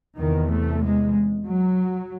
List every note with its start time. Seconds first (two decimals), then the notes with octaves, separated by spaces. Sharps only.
0.18 E2 C3 D#3
0.50 A3
0.82 G#3
1.46 F#3